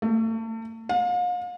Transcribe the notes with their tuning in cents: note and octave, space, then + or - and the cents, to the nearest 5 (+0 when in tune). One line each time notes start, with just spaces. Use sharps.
A3 +35
F5 +40